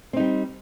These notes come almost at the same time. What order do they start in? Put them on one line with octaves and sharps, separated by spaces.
C4 D#4 G3